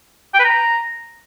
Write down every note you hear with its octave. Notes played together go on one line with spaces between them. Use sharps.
G5
B4
A#5